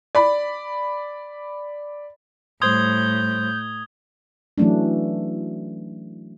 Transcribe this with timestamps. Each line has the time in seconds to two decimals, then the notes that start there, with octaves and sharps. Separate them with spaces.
0.15 D5 B5
2.62 A2 G3 C5 C6 D#6 G6 G#6 G7
4.58 E3 F#3 A3 C#4 D4